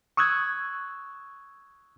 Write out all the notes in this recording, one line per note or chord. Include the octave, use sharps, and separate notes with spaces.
C#6 D#6 E6 F#6 G#6